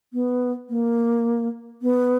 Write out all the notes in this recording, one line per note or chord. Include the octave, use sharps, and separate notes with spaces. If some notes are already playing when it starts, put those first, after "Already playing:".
B3
A#3
B3